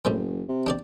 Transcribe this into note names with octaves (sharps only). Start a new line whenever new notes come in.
F#1 A2 G3 C4
C3
D4 G4 D5